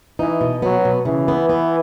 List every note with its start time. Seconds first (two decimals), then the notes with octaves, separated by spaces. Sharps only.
0.19 E3 D#4
0.41 B2
0.62 F#3 B3
0.85 B2
1.05 C#3 E3
1.28 B3
1.49 B3